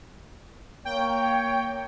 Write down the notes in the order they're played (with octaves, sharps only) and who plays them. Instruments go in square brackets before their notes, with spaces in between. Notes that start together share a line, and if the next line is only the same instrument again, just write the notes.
[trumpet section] A#3 C#5 [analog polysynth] G5